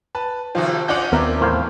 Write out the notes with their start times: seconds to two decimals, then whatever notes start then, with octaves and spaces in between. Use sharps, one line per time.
0.15 B4 A5
0.55 A2 C3 D#3 F3 F4 F#4
0.88 C#4 D4 F4 D5 D#5 F#5 G6 F#7
1.12 D#2 B3 C4 A#4 D5 E5
1.41 E2 A2 C5 F5